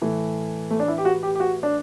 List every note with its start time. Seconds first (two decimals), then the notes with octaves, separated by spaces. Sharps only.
0.02 A2 E3 A3
0.71 A3
0.80 D4
0.88 E4
0.98 G4
1.05 F#4
1.23 G4
1.35 G4
1.40 F#4
1.63 D4